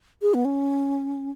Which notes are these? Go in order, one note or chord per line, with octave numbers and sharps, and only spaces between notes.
G#4
B3
C#4